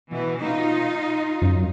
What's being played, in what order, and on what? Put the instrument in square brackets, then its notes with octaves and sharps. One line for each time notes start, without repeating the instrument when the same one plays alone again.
[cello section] B2 E3
D#4 F4
[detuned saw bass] F#2